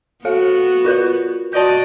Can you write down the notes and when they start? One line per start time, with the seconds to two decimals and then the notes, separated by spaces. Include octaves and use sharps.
0.25 B3 F#4 A4 F5
0.85 F4 A#4 B4
1.53 F#4 D5 D#5 A5 G6